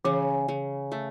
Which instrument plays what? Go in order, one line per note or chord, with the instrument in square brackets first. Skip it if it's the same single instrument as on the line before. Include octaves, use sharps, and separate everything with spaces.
[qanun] C#3 [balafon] E3
[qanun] C#3
A3